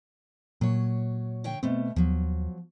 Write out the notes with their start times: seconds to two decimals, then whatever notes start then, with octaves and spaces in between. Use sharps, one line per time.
0.61 A#2 F#3 C#5
1.44 D3 C#5 G5
1.63 B2 A3 C4
1.96 D#2 F3 F#3